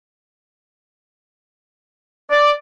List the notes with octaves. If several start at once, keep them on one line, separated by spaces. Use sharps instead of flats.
D5